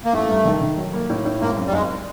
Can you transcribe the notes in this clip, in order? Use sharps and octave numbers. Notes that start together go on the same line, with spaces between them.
A#3
A1 A3
G2
D#3
D#3
F#3
A#3
A2
A2
G#1 A#3
F#2
G3
G#1 G#3